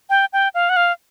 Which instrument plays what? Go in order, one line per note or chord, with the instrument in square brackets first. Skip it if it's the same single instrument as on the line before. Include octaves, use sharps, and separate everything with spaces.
[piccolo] G5
G5
F5
F#5
F5